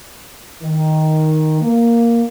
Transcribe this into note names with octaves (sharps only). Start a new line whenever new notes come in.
D#3
A#3